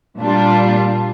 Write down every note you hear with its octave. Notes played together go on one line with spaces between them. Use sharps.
A#2 G3 D4 F4